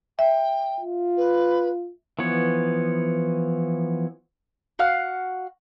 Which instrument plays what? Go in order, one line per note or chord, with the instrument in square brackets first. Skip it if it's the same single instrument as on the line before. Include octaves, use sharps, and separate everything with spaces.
[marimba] E5 [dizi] G5
[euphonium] F4
[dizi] B4
[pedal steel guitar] E3 F3 B3 C#5
[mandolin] F#4 F5 F#5 F6